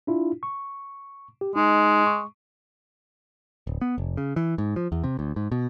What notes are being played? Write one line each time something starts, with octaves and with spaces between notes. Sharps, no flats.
D4 E4 F4
C#6
G4
G#3 D#4
C#6
D1
B3
F1
C#3
E3
G#2
F3
E2
C3
D2
G#2
B2